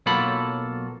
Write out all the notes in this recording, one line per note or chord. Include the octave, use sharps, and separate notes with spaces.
B1 F#3 A#3 F4 A4 B5